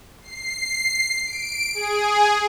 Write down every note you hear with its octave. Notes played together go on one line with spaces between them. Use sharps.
C7
D7
G#4